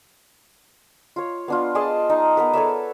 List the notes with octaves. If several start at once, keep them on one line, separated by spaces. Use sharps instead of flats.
F4 C#5
B3 D4 F4
G#4 D5 D#5 A5
D#4
B3 A#4 B4
A4 C#5 D5 E5